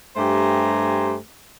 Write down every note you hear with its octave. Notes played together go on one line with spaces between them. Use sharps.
G2 A3 G4 C5 G#5 A#5